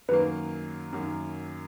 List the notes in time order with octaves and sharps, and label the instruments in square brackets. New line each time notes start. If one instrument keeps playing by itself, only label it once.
[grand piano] F#2 D#3 F#3 A#3 [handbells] B4
[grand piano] F#2 D#3 F#3 A#3